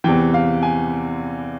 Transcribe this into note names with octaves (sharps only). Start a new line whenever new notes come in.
E2 C3 E3 G5
F5
G#5